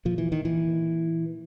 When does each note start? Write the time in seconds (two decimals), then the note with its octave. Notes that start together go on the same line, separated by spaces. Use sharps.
0.05 A#2 F3
0.18 E3
0.32 D#3
0.45 E3